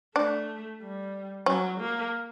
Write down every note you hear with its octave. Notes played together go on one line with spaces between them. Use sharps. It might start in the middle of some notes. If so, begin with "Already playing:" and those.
A3 D4
G3
F#3 C#4
A#3